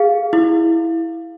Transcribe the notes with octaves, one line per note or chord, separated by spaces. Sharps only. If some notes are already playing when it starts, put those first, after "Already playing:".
Already playing: G#4 F5
E4